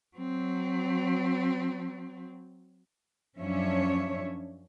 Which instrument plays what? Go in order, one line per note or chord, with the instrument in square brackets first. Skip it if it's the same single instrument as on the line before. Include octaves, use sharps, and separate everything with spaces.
[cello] F#3 C4
[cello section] F#2 F3 C#4 D4 C#5 E5